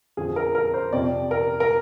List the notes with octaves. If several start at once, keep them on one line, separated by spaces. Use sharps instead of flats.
F2 D3 F3 G#4
A#4
A#4
C5
F2 C3 F3 D5
A#4
A#4